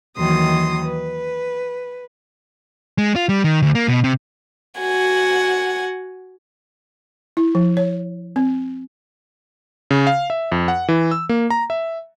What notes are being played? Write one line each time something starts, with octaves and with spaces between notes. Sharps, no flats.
D#2 D#3 E3 F#3 C6 D#6
B4
G#3
F4
G3
D#3
D2
A#3
B2
C3
F#4 F#5 G#5
E4
F3
C#5
C4
C#3
F5
E5
F2
F#5
E3
E6
A#3
A#5
E5